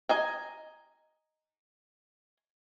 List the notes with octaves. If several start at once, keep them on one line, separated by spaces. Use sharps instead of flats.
D#5 G#5 A#5